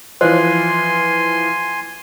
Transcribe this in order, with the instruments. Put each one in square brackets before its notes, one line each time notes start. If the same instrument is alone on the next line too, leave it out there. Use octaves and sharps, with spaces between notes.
[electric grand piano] E3 F3 F4 [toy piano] C5 [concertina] G#5 C6